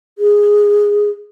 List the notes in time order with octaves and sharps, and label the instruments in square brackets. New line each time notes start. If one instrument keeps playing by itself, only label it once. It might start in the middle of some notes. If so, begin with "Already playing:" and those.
[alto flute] G#4